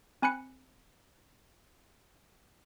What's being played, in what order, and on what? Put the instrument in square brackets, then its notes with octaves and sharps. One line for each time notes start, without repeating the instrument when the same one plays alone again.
[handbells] C4 G#5 B5 F#6 C#7